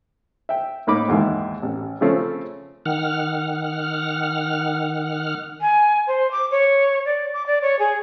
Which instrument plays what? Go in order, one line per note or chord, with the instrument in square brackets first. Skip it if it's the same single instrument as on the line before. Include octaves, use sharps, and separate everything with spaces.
[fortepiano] E5 G5
A2 A#3 D#4 B5 D6
D#2 G#2 D#3 E3
A1
C#3 F3 A3 C4 C#4
[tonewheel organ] D#3 F#5 F6
[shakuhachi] G#5
C5
D6
C#5
D5
D6
D5
C#5
G#4